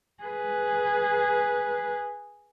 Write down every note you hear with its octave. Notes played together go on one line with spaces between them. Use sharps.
G#4 B4